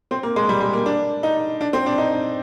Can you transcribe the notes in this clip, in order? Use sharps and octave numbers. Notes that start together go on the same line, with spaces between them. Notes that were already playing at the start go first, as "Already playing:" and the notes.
C4
A#3
G#3
G3
G#3
A#3
D4
D#4
D4
C4
D4
D#4